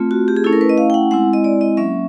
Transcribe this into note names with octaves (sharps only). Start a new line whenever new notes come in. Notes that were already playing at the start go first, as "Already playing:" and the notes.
Already playing: A3 C4 F4
F#4
G4
G#4
A3 C#4 E4 A4
A#4
B4
D#5
F5
G5
F#5
G#3 C4 E4 F#5
D#5
D5
D#5
F#3 A#3 C#4 E5